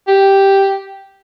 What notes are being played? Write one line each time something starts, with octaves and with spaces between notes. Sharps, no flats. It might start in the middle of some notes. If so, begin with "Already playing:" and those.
G4